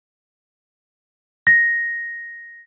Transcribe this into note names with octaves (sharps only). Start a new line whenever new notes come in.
A#6